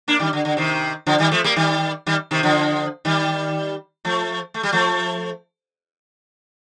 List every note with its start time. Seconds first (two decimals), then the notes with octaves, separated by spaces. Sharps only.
0.08 A#3 D4
0.20 D#3 G3
0.33 D3
0.45 D3
0.57 C3 D#3
1.07 D3 F3
1.19 D#3 G3
1.31 F3 A3
1.44 G3 A#3
1.56 D#3 G3
2.07 D#3 G3
2.31 C3 D#3
2.43 D3 F3
3.05 D#3 G3
4.05 F3 A3
4.54 A3
4.63 G3
4.72 F3 A3